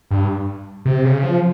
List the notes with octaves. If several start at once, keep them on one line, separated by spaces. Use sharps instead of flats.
G2
C3
C#3
F3